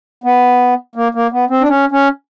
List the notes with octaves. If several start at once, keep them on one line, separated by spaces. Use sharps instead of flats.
B3
A#3
A#3
B3
C4
D4
C#4
C#4